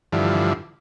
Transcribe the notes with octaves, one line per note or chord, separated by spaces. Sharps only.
G2 D3 E3 F3